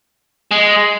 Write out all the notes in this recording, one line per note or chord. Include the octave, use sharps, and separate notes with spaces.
G#3